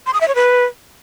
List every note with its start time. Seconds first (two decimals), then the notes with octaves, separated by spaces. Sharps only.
0.06 C6
0.14 D#6
0.21 E5
0.28 C#5
0.35 B4